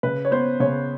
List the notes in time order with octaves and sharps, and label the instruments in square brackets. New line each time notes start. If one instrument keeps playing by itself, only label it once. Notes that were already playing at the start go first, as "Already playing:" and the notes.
[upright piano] C#3 B4
C#5
B3 C5
C#3 C#5